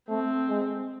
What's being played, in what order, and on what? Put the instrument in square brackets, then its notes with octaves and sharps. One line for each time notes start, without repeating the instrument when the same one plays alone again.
[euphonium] A3 [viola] C4
[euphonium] G#3